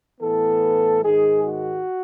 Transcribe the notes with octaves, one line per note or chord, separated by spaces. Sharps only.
A2 E3 B3 A4
G#2 D#3 G#3 G#4
F#4